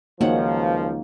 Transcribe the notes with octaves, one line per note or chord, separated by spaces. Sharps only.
C#2 D#3 F3 F#3 A#3 D#4 F#5